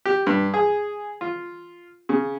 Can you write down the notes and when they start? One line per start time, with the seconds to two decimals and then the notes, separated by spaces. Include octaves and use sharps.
0.05 G4
0.27 G2
0.54 G#4
1.21 F4
2.09 C#3